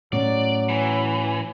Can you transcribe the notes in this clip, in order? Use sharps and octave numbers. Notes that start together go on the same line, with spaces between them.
A2 F#3 A3 C#4 D5
E3